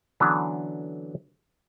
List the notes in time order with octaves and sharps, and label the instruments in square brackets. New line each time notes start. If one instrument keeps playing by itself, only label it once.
[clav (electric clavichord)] D3 E3 F#3 B3 C#4 D4